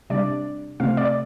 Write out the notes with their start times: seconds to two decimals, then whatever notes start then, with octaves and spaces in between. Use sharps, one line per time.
0.10 C3 G3 D4 D5
0.80 C3 A3 C4 F5
0.97 D5